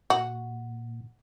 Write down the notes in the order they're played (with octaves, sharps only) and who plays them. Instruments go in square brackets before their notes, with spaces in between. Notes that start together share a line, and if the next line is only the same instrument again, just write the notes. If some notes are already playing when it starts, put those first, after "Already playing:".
[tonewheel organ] A#2 [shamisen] F#4